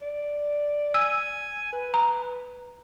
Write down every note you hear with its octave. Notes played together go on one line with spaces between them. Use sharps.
D5
G#5 E6
B4
A#5